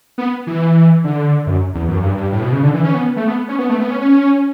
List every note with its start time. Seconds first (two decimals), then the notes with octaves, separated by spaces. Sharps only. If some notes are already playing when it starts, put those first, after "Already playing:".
0.18 B3
0.47 E3
1.04 D3
1.47 F#2
1.74 E2
1.88 F#2
2.03 G2
2.17 G2
2.32 A2
2.42 B2
2.52 C#3
2.63 D3
2.74 E3
2.84 C#4
2.95 B3
3.16 A3
3.27 B3
3.48 C#4
3.59 B3
3.69 A3
3.81 B3
3.91 C#4
4.01 C#4